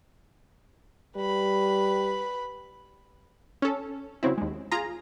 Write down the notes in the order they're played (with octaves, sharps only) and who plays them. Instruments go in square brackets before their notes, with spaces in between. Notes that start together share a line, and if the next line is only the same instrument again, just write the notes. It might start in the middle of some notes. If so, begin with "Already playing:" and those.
[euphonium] G3 [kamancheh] B4 B5
[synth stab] C#4 A4
C#3 F#3 C4 E4
D#2 G#3
F4 G#4 A#5